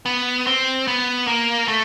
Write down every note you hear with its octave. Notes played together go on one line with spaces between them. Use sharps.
B3
C4
B3
A#3
A3